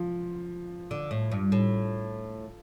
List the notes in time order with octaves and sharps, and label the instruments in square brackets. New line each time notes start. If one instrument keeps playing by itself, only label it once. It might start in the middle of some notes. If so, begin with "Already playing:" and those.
Already playing: [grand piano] F3
[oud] D3
A2
G2
A2